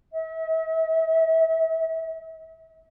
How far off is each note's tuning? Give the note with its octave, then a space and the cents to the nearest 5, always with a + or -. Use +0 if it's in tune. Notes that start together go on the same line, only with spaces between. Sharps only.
E5 -40